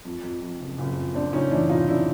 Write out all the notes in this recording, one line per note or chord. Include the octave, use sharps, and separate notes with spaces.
F2
F2
F2
F#1
F#1
F2
F2 C4 D4
F#1 C#4 D#4
E3 D4 E4
C3 D#4 F4
F2 D4 E4